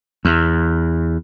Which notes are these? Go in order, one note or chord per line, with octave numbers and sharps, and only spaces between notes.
E2